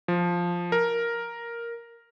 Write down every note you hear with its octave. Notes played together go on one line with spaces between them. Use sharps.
F3
A#4